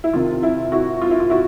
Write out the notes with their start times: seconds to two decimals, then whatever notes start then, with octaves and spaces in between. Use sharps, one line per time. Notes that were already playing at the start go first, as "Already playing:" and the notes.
0.04 E4
0.13 C3 D#3 F4
0.43 E4
0.72 E4 F#4
1.01 F4
1.11 E4
1.20 F4
1.30 E4 F#4